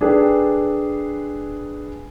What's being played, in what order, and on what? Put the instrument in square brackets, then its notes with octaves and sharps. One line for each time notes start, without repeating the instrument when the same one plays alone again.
[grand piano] D4 G#4 A4 B4 G5